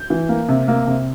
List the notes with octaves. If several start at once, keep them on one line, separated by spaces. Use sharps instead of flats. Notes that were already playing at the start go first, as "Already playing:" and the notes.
Already playing: G6
E3
A#3
C3
A#3
C3